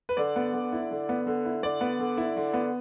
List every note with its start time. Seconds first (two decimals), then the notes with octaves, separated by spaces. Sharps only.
0.09 B4
0.17 D3 D5
0.36 B3
0.53 D3
0.73 E4
0.91 D3
1.09 B3
1.27 D3
1.45 E4
1.63 D3 D5
1.81 B3
1.99 D3
2.17 E4
2.36 D3
2.54 B3